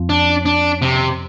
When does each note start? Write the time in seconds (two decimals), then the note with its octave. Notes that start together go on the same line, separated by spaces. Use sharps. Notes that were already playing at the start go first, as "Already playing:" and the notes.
Already playing: F2 F3 C4
0.09 D4
0.46 D4
0.82 C3